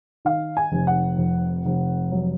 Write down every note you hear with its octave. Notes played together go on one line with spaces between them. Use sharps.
D#3 F5
G#5
F1
F#5
F2
F1
F#3